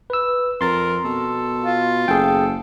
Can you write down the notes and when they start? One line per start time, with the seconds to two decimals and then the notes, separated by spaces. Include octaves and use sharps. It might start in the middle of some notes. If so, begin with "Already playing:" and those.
0.10 B4 E6
0.61 F2 A#4 C6 A6
1.05 B2 A4
1.63 F4
2.08 F#1 G#4 A4 G5